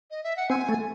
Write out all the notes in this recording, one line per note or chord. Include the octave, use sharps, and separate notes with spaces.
D#5
E5
F#5
C4 G#5
A3